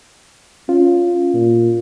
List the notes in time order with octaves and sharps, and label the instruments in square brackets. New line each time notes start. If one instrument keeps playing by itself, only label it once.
[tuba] C#4 [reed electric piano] F4
[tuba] A#2